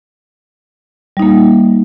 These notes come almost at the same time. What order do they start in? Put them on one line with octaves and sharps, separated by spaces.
G3 D#4 A#3